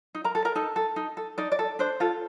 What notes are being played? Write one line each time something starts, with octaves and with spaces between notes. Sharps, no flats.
D#4
A#4 A#5
A4
A#4 A#5
D#4 A4 A5
A4
D#4
A4
D#4 D5
D5
A4
D4 C5
F4 A4